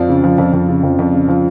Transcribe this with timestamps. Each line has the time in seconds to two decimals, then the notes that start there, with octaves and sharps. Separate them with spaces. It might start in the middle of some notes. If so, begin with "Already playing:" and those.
Already playing: F2 F3 D5
0.09 C#3
0.24 F3
0.38 F2
0.53 F2
0.69 C#3
0.83 F2
0.99 F2
1.13 C#3
1.28 F3